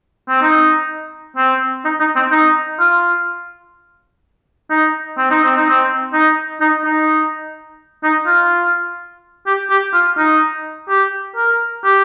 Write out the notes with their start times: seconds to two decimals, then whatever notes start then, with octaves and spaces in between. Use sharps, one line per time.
0.29 C4
0.42 D#4
1.37 C4
1.85 D#4
2.00 D#4
2.16 C4
2.32 D#4
2.80 F4
4.70 D#4
5.18 C4
5.31 D#4
5.44 C4
5.57 D#4
5.69 C4
6.13 D#4
6.61 D#4
6.84 D#4
8.04 D#4
8.27 F4
9.46 G4
9.70 G4
9.94 F4
10.17 D#4
10.89 G4
11.36 A#4
11.84 G4